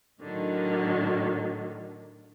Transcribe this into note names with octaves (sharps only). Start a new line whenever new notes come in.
A2 D3 D#3 F#3